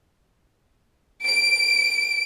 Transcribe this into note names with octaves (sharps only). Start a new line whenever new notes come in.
D7